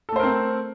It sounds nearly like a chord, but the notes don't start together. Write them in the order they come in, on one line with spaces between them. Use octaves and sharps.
A4 A3 C5 A#4 C4